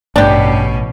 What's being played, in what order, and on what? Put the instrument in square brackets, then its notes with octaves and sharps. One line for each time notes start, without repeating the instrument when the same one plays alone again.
[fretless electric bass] A1 [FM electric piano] G2 D5 [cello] B2 C#4 [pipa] D4 G4